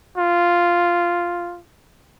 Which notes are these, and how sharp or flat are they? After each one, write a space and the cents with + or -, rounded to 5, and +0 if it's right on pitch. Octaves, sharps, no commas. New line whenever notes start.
F4 -5